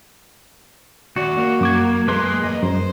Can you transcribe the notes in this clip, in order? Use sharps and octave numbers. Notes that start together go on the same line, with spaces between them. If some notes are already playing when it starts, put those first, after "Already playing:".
D#2 F#4 D5
A#3
F#2 D6 G#6
G#3 A#3 B4 C6
E2 D#5
F#2 C5